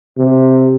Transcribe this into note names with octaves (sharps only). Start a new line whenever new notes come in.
C3